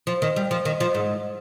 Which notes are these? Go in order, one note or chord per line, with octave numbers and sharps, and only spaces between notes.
F3
D#3
G3
F3
D#3
F3
G#2